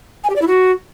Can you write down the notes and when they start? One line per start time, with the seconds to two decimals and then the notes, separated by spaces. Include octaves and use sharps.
0.24 G#5
0.30 G4
0.36 D5
0.42 E4
0.48 F#4